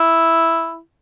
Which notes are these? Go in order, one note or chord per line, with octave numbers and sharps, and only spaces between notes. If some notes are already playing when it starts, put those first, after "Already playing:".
Already playing: E4